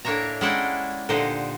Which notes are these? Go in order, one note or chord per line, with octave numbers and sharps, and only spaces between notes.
A2 A#3 D4 C#5 E5 A#5
G#3 C#4 D4 E4 F#5 G5
A#2 D3 D#4 G4 C5 F#5